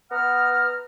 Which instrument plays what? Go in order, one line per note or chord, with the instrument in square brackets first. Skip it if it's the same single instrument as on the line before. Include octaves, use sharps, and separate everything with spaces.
[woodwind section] B3 F#5 A#5 D#6 F6